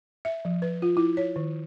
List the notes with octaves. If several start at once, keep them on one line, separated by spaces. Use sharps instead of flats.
E5
F3
B4
F4
E4
C#5
D#3